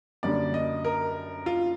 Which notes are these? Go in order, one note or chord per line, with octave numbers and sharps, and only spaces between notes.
F#2 D3 G3 A#3 D5
D#5
A#4
F4